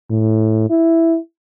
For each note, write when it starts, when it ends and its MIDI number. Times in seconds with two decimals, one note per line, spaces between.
0.10 0.67 45
0.70 1.17 64